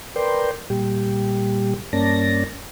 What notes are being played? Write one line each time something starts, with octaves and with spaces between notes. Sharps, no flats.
A#4 B4 D5 G5 C6
A#2 G3 G4
G2 A#3 C#4 D5 A5 A#6